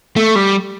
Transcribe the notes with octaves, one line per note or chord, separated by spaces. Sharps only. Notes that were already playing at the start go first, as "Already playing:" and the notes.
A3
G3